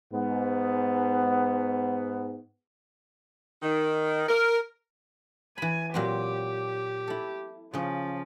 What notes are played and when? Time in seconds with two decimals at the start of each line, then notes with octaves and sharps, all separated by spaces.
0.13 G#2 B3
3.61 D#3
4.28 A#4
5.58 E3 G#5 B5
5.94 A#2 F#3 C4 G4
7.07 E4 A4
7.74 C#3 F3 C#4